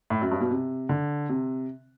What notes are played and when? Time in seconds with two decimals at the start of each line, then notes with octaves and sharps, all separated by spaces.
0.10 A2
0.21 F#2
0.31 G2
0.41 B2
0.51 C3
0.89 D3
1.29 C3